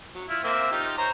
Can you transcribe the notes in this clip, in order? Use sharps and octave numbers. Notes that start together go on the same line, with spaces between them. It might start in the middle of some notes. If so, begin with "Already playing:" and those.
F#3
E4 F4
A#3 C4 E5
D#4 F4 G4
C5 C#5 A#5